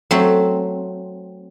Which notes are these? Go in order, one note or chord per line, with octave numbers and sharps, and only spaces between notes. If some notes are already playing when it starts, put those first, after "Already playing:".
F#3 A3 C4